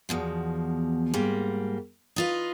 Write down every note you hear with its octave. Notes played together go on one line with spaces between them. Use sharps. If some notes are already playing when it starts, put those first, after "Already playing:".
E2 B2 F3
G#2 G3 A#3
D#4 F4 B4